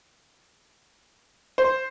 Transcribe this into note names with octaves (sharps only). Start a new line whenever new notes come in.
C5